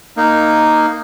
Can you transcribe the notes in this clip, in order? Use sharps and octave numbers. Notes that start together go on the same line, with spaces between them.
A#3 D#4